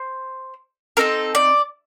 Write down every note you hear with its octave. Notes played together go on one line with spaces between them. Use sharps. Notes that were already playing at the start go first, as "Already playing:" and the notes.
Already playing: C5
C4 D#4 A4 A#4
D5